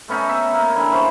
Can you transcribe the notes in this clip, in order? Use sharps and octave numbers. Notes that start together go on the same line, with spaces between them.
A3 B3 C#4 D#4
E5
A#3 D#4
D3 E3
C#4 G#4 C5 C#5